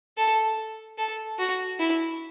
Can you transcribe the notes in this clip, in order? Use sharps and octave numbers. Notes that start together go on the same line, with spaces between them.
A4
A4
F#4
E4